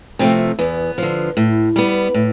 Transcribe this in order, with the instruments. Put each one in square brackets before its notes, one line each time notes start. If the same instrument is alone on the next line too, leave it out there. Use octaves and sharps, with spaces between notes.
[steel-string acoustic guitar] C3 F3 A3 C4
E2 B3
D3 F3
A2
G3 B3
A2